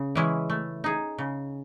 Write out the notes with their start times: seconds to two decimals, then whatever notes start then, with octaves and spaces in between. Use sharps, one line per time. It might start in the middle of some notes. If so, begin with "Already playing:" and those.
Already playing: C#3
0.15 E3 G#3 C#4 E4
0.50 A3
0.84 D#4 G#4
1.18 C#3